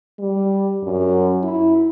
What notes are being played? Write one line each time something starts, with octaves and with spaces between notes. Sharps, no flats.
G3
F#2
E4